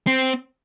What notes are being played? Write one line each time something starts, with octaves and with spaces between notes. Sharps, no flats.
C4